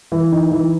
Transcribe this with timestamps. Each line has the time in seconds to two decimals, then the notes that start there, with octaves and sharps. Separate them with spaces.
0.12 E3
0.32 D#4
0.52 E3